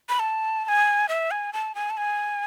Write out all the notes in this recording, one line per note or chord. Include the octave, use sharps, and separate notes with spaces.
B5
A5
A5
G#5
E5
G#5
A5
G#5
A5
G#5